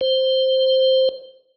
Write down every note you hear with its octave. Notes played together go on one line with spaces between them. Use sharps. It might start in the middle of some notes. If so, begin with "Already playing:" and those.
C5